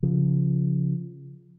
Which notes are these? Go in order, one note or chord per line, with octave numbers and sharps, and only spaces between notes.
C#3 F3